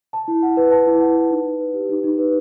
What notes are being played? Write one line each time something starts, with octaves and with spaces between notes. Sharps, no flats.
A5
E4
F#5
B4
A5
E4
F#5
B4
D#4
D#4
B4
G4
D#4
D#4
B4